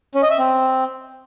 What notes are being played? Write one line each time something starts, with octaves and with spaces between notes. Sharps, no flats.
C#4
D#5
E5
C4